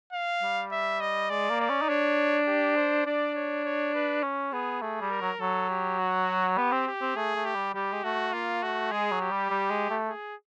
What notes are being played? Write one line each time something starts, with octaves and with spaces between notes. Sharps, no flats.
F5
G3
E5
D#5
G#3 D5
A#3
D5
C#4
D#4
D4 C#5
G4
C5
D4 D5
C#5
C#5
B4
C#4
B3 G#4
A3 G#4
G3
A#4
F#3
F#3 A4
G4
F#4
B3 G4
C4
G4
C4
A3 G#4
A3
G4
G3
G3 G4
G#3
A3 F#4
A#3 F4
A3 F#4
G#3 G#4
F#3
G4
G3
G3
G#3
A3
G#4